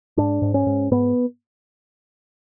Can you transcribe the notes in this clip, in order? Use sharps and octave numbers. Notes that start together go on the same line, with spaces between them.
G#2 D4
G#2
C#4
G#2
G#2 B3